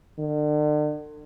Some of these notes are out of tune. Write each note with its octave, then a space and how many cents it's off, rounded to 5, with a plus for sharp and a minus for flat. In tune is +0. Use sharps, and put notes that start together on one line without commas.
D3 +40